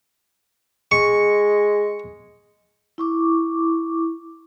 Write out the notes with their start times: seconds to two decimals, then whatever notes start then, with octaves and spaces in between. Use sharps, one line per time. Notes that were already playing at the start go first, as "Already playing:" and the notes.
0.91 G#3 C#6
2.98 E4 C#6 D6